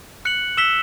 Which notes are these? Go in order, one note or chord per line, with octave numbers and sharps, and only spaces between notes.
F#6 C#7 F#7
E6 B6 E7 G7